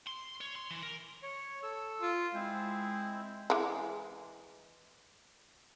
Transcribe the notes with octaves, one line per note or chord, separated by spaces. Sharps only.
C6
C#5
C6
E3
A#4
C#5
A4 E6
F4
G#3 C4 E4 C5
E3 G#3